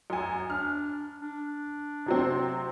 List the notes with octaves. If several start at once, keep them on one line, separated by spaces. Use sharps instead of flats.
F#2 G#5
D4 F6
D4
C3 F#3 C4